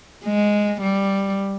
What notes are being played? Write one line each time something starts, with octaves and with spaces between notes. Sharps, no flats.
G#3
G3